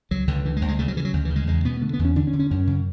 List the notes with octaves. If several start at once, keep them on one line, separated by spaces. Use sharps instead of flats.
C#2 F#3
C#2 D3
D3 E3
G#3
D2
G#3
C#3 A3
F#3
C#3 E3
F#3
D2
E3
C#3
G#3
E2 G#3
B2 B3
D3 A3
B3
E2
C#4
D3 D4
C#4
D3
C#4
F#2 C#4
C#3